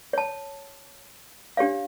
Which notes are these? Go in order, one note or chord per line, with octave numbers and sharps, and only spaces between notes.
C#5 A5
D4 G4 C#5 F5